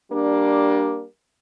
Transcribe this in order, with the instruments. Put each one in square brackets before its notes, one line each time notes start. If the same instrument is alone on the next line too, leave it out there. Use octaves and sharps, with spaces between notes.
[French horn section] G3 A#3 D4